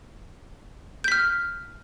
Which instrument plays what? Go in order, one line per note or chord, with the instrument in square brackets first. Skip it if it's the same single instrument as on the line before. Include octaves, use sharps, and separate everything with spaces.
[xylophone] G6
B6
F6